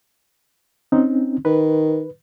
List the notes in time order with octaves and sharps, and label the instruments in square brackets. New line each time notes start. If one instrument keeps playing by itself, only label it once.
[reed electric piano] C4 C#4 D#4
[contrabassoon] D#3 [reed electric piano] B4